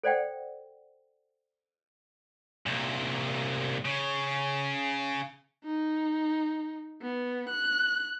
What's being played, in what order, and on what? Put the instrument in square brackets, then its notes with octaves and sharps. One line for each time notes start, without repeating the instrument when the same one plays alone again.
[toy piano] A4 C5 D5 F#5 G5
[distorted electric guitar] C2 A#2
C#3
[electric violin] D#4
B3
F#6